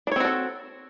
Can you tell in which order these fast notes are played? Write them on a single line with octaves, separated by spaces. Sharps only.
D4 C#5 C4 F#4 A4